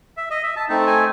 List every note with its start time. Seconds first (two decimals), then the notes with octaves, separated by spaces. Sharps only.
0.17 E5
0.30 D#5
0.43 E5
0.56 A5
0.69 A3 C4 D#4 A5
0.87 G#5